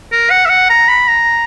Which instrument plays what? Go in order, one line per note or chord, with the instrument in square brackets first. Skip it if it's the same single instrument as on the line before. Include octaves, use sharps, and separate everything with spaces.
[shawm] A#4
F#5
E5
F#5
A#5
B5
A#5